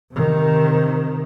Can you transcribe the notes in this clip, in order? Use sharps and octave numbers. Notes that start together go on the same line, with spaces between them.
C3 D#3